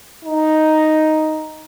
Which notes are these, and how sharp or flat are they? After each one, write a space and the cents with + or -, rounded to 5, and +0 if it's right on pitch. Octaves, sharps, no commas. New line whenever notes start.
D#4 +5